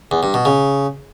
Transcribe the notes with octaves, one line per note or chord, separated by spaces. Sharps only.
E2
G2
B2
C#3